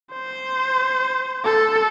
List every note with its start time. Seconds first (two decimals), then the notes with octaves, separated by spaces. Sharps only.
0.13 C5
1.45 A4